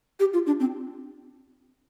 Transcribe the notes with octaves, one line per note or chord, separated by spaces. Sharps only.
G4
F4
D4
C4